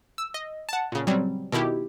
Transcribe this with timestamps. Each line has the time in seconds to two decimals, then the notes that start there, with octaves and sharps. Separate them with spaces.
0.18 E6
0.34 D#5
0.69 F#5 A5
0.92 A#2 C#3
1.07 F#3 G3 C4
1.52 B2 D#3 E4 G4